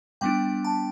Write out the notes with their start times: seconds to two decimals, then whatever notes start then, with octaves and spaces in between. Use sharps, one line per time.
0.21 G3 B3 D4 G5
0.64 A5